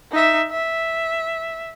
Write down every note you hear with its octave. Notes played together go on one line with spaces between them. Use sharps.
D#4 E5
E5